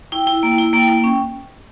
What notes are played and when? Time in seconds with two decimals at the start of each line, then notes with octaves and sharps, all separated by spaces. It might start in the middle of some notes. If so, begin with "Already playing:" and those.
0.12 E4 G5
0.27 E4
0.43 A#3
0.58 E4
0.73 A#3 G5
0.89 A#3
1.04 C#4